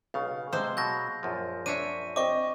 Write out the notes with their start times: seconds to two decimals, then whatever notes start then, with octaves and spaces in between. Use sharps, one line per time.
0.14 B1 C#3 F5
0.53 C3 G#3 C5
0.77 B2 F#3 G6 A#6
1.23 A#1 F#2 F3
1.66 D4 C#5 E5 D#7
2.16 C4 D#5 C#6 D6